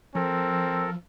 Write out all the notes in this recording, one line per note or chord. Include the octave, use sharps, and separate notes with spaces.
F3 C4 A4 A#4